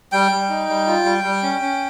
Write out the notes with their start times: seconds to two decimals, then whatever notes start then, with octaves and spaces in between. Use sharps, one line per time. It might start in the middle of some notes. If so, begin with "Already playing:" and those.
0.12 G3 G5
0.31 G3
0.49 D#4
0.69 G3
0.88 F4
1.05 G3
1.24 G3
1.43 C#4
1.62 C#4